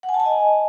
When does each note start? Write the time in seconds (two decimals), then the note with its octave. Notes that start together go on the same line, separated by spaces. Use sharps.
0.03 F#5
0.09 G#5
0.14 A5
0.20 G#5
0.25 D#5